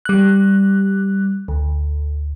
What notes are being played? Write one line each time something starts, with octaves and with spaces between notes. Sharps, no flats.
G3 F#6
D2